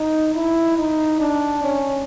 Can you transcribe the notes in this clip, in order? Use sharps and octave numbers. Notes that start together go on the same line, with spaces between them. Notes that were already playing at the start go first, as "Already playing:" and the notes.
Already playing: D#4
E4
D#4
D4
C#4